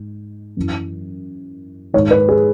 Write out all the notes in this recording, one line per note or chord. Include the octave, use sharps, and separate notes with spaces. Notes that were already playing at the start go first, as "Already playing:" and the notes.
Already playing: G#2
F#2 E3
G#2 D#3 C#5
B4
G#4